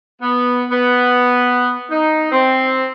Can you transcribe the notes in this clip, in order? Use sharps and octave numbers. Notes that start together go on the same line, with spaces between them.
B3
B3
D#4
C4